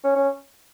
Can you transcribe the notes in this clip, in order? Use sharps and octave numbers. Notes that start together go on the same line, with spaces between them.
C#4
C#4